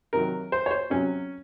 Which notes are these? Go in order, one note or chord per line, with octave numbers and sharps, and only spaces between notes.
C3 D#3 F#3 A#4
C5
C#5
C5
C3 F#3 C#4